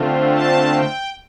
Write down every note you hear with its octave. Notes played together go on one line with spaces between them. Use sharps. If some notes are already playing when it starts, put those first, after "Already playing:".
Already playing: D3 A3 C4 F4
A5
G5